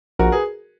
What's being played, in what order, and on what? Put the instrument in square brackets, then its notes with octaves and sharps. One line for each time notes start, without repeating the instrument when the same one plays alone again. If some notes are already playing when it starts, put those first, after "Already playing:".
[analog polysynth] A#1 [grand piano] F#4 A#4
[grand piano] G#4 B4